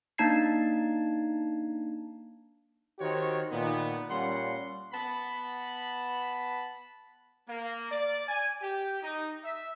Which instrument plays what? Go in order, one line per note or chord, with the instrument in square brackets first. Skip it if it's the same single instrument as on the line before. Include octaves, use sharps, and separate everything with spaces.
[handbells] A#3 D4 D#4 A5 G#6 C7
[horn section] D#3 F#4 G4 C5 C#5
A#2 D#3 B3
A#2 G3 A#3 C#4 F#5 C6
B3 A5 B5
[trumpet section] A#3
D5
G#5
G4
D#4
E5